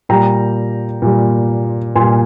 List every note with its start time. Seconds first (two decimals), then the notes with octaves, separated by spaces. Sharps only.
0.09 A#2 G3 G5 A#5
1.02 A#2 G3
1.95 A#2 G3 G#5 C6